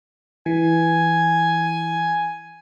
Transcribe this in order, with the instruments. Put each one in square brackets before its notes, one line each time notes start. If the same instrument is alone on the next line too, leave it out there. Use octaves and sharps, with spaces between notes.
[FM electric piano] E3 [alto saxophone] G#5